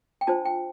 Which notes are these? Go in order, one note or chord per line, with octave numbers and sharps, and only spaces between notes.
G5
D4 F4 C5 A5
G5